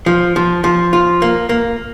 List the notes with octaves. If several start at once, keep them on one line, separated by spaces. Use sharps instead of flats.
F3
F3
F3
F4
A#3
A#3